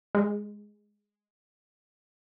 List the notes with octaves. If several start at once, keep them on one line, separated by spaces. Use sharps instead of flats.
G#3